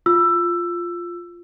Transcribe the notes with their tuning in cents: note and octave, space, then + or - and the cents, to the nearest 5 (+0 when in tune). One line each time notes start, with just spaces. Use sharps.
F4 +0 E6 +15